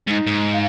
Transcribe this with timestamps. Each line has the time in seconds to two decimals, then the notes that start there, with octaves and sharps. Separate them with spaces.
0.07 G#2 D#4
0.27 G#2
0.53 F5